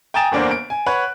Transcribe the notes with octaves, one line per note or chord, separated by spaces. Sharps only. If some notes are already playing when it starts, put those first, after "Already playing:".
G5 G#5 A#5 D#6 A6 E7
G1 E2 A#3 D4 C5
D7
G#5
B4 C#5 F#5 B5 F#6